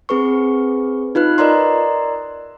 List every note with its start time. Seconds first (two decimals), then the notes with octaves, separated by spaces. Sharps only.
0.09 C4 G#4 B4 C#6
1.15 D#4 F4 B4 F#6
1.38 A#4 D5 D#5 A#5 C6